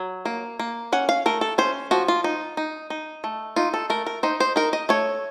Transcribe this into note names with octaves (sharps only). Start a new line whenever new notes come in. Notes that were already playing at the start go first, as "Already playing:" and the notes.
Already playing: F#3
A#3
A#3
C#4 F#5
F5
A3 A#4
A4
C#4 C5
F3 F#4
F4
D#4
D#4
D#4
A3
D#4 F4
A4
A3 A#4
A#4
D#4 C5
C5
D#4 A#4
D#5
A3 C#5